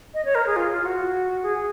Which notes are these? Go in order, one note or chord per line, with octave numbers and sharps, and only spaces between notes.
D#5
C#5
A#4
G#4
F4
F4
F#4
G#4